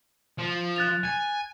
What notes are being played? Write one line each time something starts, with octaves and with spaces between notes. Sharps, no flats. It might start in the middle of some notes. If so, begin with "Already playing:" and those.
F3
F#6 A6 F7
G#5